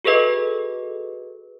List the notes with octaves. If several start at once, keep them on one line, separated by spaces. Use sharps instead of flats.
F#4 G#4 A4 B4 D#5